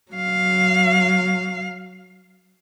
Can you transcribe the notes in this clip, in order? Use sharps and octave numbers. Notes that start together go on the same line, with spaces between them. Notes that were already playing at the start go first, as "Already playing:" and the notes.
F#3 F5